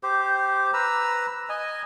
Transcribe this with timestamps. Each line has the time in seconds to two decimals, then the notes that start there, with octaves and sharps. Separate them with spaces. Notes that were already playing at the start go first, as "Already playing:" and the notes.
0.03 G4 C5
0.74 B4 A#5 E6
1.49 D#5 G#5